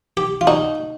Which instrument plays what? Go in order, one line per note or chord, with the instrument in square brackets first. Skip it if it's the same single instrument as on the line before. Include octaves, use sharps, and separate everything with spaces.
[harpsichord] G4
F4
[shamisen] D#4 [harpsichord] F#4